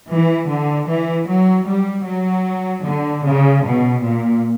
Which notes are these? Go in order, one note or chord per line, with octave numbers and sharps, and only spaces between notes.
E3
D3
E3
F#3
G3
F#3
D3
C#3
B2
A#2